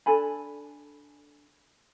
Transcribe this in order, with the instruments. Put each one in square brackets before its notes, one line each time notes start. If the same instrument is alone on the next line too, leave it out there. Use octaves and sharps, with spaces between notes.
[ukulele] D4 A4 G#5 B5